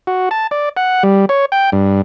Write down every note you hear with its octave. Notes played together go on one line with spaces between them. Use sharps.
F#4
A5
D5
F#5
G3
C#5
G5
G2